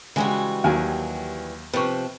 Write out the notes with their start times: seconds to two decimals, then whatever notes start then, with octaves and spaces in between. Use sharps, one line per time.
0.16 C#3 E3 G3 G#3 F#4
0.64 D#2 F#3 G#5
1.73 C3 F3 B4 C#6